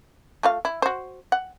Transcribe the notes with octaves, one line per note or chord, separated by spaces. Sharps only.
A3 F4 F5
E4
F#4 C5
F#5